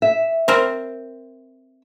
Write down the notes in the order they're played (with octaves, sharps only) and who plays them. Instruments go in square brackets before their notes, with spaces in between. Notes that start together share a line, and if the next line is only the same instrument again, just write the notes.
[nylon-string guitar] E5
[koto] C4 A#4 C5